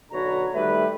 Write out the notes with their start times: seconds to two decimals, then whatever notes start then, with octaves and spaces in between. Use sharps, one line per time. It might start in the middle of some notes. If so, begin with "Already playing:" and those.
0.12 B1 D3 F#4 B4 C#5 A#5
0.55 D#3 G3 A3 G4 B4